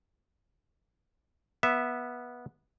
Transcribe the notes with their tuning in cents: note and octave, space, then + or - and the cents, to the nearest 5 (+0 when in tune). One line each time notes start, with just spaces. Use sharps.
B3 -15 E5 +0